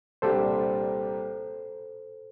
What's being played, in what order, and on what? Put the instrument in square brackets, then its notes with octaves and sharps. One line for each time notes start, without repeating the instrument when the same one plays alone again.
[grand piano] C2 A#2 G3 D4 G4 [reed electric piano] A4 C5